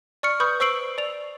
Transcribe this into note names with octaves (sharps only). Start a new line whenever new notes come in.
D5 C#6 F6 C#7
B4 B5 C#6 D#6 G6
C5 C#6 E6 C7 D7 F#7
D5 F7